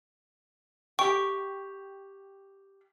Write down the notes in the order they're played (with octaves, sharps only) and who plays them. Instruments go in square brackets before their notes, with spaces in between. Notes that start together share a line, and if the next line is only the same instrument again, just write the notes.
[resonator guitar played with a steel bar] G4 G5 [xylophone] C#6